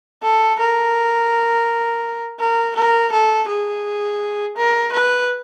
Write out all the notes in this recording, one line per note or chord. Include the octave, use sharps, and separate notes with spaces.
A4
A#4
A#4
A#4
A4
G#4
A#4
B4